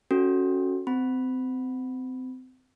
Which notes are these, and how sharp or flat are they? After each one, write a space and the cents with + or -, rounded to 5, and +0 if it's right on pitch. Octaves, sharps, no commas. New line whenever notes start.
C#4 +0 F#4 +0 A4 +0
C4 -30 B5 +0